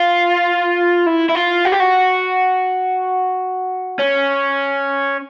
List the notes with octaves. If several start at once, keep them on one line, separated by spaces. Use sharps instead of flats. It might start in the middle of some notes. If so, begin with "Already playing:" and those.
Already playing: F4
E4
E4
F4
F#4
G4
F#4
C#4